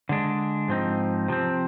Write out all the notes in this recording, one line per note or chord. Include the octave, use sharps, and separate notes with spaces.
D3 G#3 D4
G#2 F3 C4 D#4
C3 F3 C4